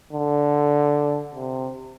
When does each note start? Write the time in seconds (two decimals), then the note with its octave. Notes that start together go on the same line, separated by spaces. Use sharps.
0.13 D3
1.35 C3